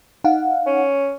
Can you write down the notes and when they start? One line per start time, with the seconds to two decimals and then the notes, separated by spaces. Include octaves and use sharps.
0.24 D#4 F5 F#5
0.66 C#4